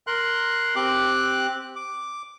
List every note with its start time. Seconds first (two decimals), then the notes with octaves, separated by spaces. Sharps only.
0.07 A#4 C6 F#6
0.76 C4 G4 D6 F#6
1.76 D6